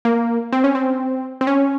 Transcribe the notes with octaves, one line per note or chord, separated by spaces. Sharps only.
A#3
C4
C#4
C4
C4
C#4